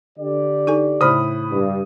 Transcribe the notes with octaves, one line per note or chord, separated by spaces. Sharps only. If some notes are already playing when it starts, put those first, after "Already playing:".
D3 G4 D5
D#4 A4 G#5
A2 C#3 C5 B5 D#6 F6
G2